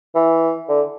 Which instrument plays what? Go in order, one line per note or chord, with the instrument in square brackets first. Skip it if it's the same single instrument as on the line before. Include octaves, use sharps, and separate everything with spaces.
[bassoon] E3
D3